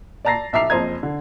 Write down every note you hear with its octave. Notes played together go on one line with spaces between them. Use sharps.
D5 A5 A#5 A6 A#6 C7
B1 E5 A#5 D6 C7 F7
F#1 F2 C5 D#5 A#5 G#6
D3